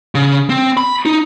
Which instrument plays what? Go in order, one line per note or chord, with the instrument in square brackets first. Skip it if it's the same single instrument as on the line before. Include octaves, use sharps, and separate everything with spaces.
[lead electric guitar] C#3
C4
B5
D#4